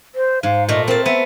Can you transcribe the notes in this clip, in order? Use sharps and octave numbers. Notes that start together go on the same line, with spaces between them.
C5
G#2 F5
A#2 A3 D#5
C4 A#4 A5
B3 E5